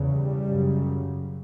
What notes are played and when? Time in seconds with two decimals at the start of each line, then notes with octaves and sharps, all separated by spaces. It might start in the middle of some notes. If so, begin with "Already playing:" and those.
Already playing: E2 C#3
0.12 G3
0.47 F#2 C#3